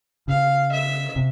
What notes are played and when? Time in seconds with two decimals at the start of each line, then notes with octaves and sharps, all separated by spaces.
0.28 C#3 F5
0.72 E5
1.16 C3